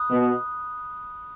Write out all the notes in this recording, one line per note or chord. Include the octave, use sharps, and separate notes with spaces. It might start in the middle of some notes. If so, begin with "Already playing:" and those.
Already playing: B5 D#6 F#6
B2